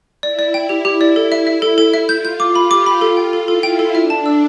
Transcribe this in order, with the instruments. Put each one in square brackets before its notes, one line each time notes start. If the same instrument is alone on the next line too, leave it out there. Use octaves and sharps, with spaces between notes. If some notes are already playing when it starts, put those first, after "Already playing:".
[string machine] E4 [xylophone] D5
[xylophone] D5
G5
[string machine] E4 [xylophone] G4
[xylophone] G4
D5
A4
E5
E5
A4
A4
E5
[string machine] F4 [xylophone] G6
[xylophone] G6
D6
[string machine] G4 [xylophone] B5
[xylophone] D6
B5
[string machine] F4 [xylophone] A4
[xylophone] G5
A4
[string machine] E4 [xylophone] A4
[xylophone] G5
A4
[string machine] D4 [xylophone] E5
[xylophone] A5
E6